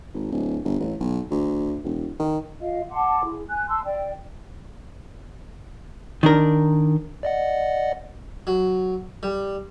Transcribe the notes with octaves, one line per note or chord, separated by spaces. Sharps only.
G#1
D1
G1
A1
B1
D2
E1
D#3
F4 D#5 F5
F#5 A5 C6 D6
E4 G#4
G#5 F#6
A5 C6 E6
D5 G5
D#3 D4 A#4
D5 D#5 F#5
F#3
G3